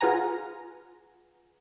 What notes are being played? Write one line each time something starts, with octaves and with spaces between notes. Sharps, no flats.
F4 G#4 B4 F#5 G#5 A#5